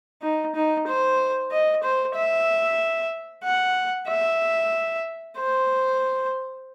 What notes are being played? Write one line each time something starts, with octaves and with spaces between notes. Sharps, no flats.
D#4
D#4
C5
D#5
C5
E5
F#5
E5
C5